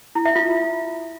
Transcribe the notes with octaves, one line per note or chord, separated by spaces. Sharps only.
E4
E5
F4